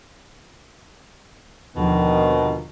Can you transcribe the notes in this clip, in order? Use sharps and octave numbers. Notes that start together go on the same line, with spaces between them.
D#2 B2 D3 D#3 F3